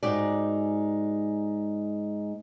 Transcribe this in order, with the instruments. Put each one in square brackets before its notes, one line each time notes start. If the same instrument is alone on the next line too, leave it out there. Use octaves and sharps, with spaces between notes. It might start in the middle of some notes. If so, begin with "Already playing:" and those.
[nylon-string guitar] G#2 G#3 D#4 F#4 G4 D5